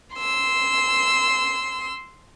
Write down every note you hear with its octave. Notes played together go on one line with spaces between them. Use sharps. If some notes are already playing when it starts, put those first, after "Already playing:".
C6 E6